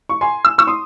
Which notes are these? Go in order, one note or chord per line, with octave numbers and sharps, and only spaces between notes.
C#6
G#5 C6
E6
C#6 E6
C6 D#6